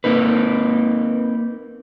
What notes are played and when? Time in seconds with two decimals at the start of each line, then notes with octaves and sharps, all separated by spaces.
0.04 A#3 C4 D#4 B4